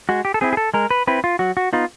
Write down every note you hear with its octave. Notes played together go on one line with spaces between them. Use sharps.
G#3 F#4
G4
A4
C4 E4 G#4
G#4
A4
G#3 A#4
B4
C4 E4 B4
F4
F#3 F#4
F#4
B3 D#4 F4